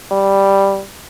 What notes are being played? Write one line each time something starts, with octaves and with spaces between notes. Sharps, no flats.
G3